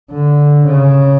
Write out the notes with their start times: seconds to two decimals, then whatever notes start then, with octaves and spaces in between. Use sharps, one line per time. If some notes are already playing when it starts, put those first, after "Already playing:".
0.11 D3
0.66 C#3